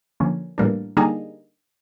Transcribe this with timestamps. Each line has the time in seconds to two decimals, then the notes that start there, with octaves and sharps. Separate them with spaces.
0.20 D3 F3 A#3 C#4
0.58 A2 E3 G3 A#3 D4
0.97 D3 G3 A#3 D#4 G#4